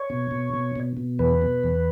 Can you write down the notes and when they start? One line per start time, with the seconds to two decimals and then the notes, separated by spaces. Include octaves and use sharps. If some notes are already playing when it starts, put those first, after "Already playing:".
Already playing: C#5
0.10 B2
0.31 B2
0.53 B2
0.76 B2
0.97 B2
1.19 E2 B4
1.42 B2
1.64 E2